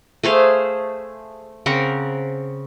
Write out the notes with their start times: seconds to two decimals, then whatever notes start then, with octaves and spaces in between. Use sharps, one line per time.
0.23 A3 G#4 C5 F5
1.66 C#3 C4 A#4 F#5